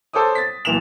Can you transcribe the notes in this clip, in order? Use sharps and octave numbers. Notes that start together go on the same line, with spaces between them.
A4 C5 C#5 D6 D#6
A6 B6
B1 A#2 E3 E7 F7